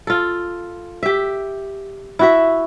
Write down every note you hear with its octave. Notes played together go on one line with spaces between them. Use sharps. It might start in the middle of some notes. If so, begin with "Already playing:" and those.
F4 A4
G4 E5
E4 F#4 E5